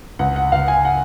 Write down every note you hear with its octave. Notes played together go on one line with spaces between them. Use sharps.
C#2 F#5
F#5
C#2 F5
G#5
F#5